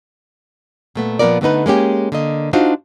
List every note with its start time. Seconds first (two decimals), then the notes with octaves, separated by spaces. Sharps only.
0.95 A#2 A3 B3
1.19 A#2 F3 B3 F4 A#4 D5
1.41 D3 A3 B3 D#4 B4
1.66 G#3 A#3 C#4 G4
2.12 D3 A#3 D#5
2.53 D4 D#4 F4 F#4 C5